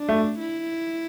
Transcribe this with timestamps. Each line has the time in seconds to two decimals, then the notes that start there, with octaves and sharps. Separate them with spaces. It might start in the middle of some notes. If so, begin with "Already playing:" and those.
Already playing: D4
0.09 A3
0.39 E4